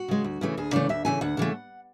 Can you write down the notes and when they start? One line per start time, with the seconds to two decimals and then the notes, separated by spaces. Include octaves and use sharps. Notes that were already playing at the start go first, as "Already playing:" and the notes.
Already playing: F#4
0.08 C#3 G#3
0.24 D2
0.41 C#3 E3 A3
0.57 D2 G#4
0.73 C#3 E3 A3 D5
0.89 D2 E5
1.05 C#3 E3 A3 G#5
1.21 D2 F#5
1.37 C#3 E3 A3